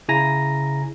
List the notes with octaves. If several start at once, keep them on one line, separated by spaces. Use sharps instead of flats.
C#3 E4 G#5 A#5 A#6